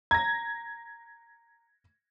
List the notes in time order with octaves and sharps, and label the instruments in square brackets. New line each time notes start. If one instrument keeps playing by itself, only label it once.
[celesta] A#5 [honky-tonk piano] G#6 A#6